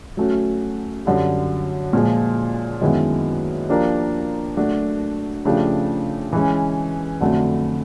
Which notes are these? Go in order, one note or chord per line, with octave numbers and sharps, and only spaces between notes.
F#3 A3 C#4 F#4
F#2 D3 G3
A#2 F3 G#3
F#2 D#3 G#3 B3 E4
F3 A#3 D4 G4 A#4
F#3 A3 D4 F#4
C#3 F3 A3 D4 G4
E3 G#3 C#4
F2 D3 F#3 A3